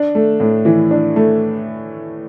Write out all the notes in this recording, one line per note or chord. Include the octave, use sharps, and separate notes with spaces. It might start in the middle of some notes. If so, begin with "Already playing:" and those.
Already playing: D4
A3
A2
E3
D4
A3